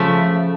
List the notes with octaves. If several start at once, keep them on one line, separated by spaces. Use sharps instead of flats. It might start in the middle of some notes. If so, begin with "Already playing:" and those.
Already playing: C#3 F3 A3 E5